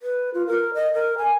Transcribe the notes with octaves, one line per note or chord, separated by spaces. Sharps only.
B4
F4
A#4
D#5
A#4
G#5